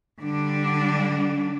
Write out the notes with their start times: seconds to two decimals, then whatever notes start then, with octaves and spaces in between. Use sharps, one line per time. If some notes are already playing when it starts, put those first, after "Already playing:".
0.21 D3 G3 D4